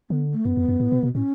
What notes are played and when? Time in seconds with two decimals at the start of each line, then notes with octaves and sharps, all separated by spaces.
0.10 D3 B3
0.33 A3
0.45 F#2 B3
0.57 F2
0.68 F#2
0.80 A2
0.92 B2
1.03 B2
1.15 A2 C#4